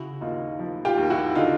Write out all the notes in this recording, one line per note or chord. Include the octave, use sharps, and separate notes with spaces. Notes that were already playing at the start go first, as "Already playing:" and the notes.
Already playing: C#3 E4 F#4
D#2 D#4 F4
F3
F4 G4
D#2
E4 F#4
D3 D#4 F4